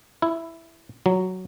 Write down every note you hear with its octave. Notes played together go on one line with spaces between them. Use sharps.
E4
F#3